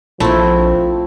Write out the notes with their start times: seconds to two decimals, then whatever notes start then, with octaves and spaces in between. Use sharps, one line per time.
0.20 A#1 F3 A3 C4 E4